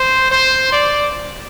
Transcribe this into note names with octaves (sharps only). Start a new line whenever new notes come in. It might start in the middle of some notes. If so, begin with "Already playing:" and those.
Already playing: C5
C5
D5